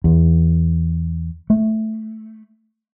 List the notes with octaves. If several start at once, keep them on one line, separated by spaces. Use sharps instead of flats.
E2
A3